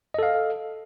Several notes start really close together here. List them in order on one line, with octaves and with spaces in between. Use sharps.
D#5 A4 F5